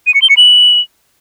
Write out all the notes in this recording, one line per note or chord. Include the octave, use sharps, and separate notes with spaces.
D#7
C#7
G7
C#7
F#7